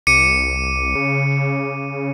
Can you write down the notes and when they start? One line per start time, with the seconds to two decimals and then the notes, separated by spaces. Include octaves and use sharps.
0.07 C2 D6 C#7 D#7
0.95 C#3